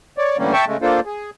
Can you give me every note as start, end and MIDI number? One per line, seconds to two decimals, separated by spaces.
0.18 0.37 73
0.18 0.37 74
0.38 0.53 45
0.38 0.53 50
0.38 0.53 52
0.38 0.53 55
0.38 0.53 58
0.38 0.53 61
0.53 0.65 76
0.53 0.65 79
0.53 0.65 81
0.53 0.65 85
0.67 0.77 49
0.67 0.77 56
0.67 0.77 57
0.82 1.00 58
0.82 1.00 62
0.82 1.00 65
0.82 1.00 69
0.82 1.00 72
1.06 1.30 68